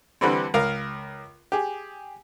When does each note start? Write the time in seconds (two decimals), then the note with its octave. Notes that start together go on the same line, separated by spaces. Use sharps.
0.21 D3 E3 G3 C4
0.54 C#2 A#4 F5
1.52 G4 G#4